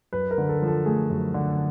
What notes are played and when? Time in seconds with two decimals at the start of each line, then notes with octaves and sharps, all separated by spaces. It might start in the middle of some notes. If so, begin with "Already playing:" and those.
0.13 F#2 B4
0.31 A#4
0.38 D3
0.49 A4
0.62 F3
0.68 A4
0.85 A3 G#4
1.10 F#2
1.34 D3